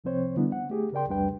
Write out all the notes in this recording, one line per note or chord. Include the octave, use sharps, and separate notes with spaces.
C2 C3 F3 C4 C5 C#5
D3 G3 B3 D4 E4
F#5
A3 G4 G#4
C#3 A#4 D5 G5 C6
C2 F2 G3 D4 B4 G5